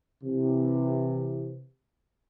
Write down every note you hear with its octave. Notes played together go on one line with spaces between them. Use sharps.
C3 E3